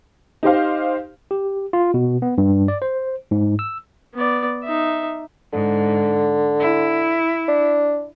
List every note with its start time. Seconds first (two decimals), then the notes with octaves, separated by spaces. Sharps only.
0.43 D#4 G4 C5 F5
1.31 G4
1.73 F4
1.94 B2
2.22 B3
2.38 G2
2.68 D5
2.82 C5
3.31 G#2
3.59 E6
4.14 B3 D5
4.64 D#4 E5
5.53 G#2 D3
6.61 E4
7.48 D4